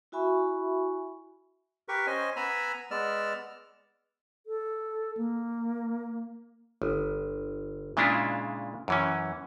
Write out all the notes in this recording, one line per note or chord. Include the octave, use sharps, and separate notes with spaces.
E4 F#4 E5 G#5 B5 C#6
G4 A#4 B4 C#6
C#4 C5 D#5 G#5
B3 G#5 A#5 B5 E6
G#3 B3 D5 E6 F6
A4
A#3
G1
A#2 C#3 G#3 D4 E4 F4
F#2 E3 C#4